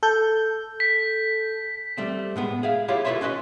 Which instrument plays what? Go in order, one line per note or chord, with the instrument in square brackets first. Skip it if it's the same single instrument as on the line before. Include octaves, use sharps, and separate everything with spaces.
[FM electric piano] A4 G6
[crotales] B6
[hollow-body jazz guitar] G3 A3 C4
A2 G#3 B3
G#4 E5 F5
E4 F4 G4 G#4 C#5 F5
F4 A4 B4 C#5 E5 C6
C#4 F#4 B4 D#5 C6